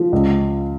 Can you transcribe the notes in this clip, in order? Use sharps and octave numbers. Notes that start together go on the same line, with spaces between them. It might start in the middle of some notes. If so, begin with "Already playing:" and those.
Already playing: F3
C#2